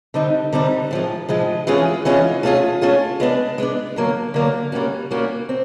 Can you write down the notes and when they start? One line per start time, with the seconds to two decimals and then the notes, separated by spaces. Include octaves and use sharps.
0.14 D3 G3 C4 D#4
0.53 D3 G3 C4 D#4
0.91 A2 F3 G#3
1.29 A2 F3 G#3
1.67 E3 G#3 C#4 F4 G#4
2.05 E3 G#3 C#4 F4 G#4
2.43 A3 C#4 F4 G#4
2.82 A3 C#4 F4 G#4
3.20 G#3 B3 D4
3.58 G#3 B3 D4
3.96 D3 F#3 A#3
4.34 D3 F#3 A#3
4.72 G3 A#3 C#4 F#4
5.11 G3 A#3 C#4 F#4
5.49 C4